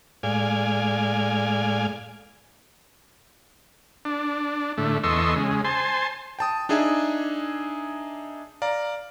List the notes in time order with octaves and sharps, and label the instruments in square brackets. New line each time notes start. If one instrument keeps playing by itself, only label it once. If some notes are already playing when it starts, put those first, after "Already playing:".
[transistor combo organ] A2 G#3 D5 F5 G#5
D4
A2 D3 A3
E2 A4 D#5 C6 C#6 E6
C#3 G#3
C5 G#5 A5 C6
[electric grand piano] G5 A5 D#6
D4 D#4 G#4 E5 G#5
D5 F5 A#5